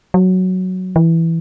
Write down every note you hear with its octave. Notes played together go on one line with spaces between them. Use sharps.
F#3
E3